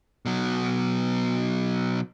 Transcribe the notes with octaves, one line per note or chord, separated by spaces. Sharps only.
B2 F#3